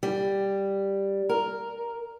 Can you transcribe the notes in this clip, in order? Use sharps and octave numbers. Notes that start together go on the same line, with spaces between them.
G3
A#4